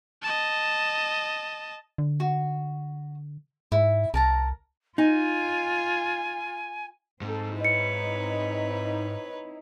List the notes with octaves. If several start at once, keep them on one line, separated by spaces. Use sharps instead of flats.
D#5 A5
D3
F#4
G#2 E4
C2 A#4 A5 A#5
D#4 F4 G#5
G#2 C4 A4
C4 D#4 E4 B4 C#5 D#5 C#7